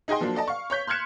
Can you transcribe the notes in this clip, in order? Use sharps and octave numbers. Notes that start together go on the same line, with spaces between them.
D#4 G#4 D#5 G5 C6
F3 F#3 A#3 D4
A4 D5 D#5 A5
F5 C#6
C#5 C#6 G6 B6
C6 F6 F#6 G#6 C#7 E7